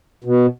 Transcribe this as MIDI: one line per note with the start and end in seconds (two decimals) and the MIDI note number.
0.24 0.46 47